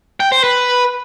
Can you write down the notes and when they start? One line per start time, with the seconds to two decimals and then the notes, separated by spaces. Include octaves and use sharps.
0.20 G5
0.32 C5
0.44 B4